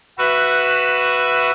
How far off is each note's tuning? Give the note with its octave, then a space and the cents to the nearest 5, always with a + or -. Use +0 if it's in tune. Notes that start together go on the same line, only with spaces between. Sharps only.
F#4 +0 B4 +5 E5 +15